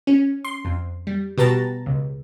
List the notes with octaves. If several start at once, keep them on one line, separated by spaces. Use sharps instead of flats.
C#4
C6
F2
G3
B2 G4 B4 A5 A#5 A6
C#2